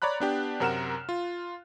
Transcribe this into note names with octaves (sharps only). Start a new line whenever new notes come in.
C#5 D5 A#5 B5 F#6
B3 D4 G4
F#2 C3 A#4 F#5 F6 E7
F4